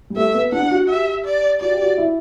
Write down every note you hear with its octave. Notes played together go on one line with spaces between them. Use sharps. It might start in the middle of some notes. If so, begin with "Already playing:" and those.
G3
A3 E5
B3
D4 F#5
F#4
G4 E5
D5
F#4 D5
G4
F#4
E4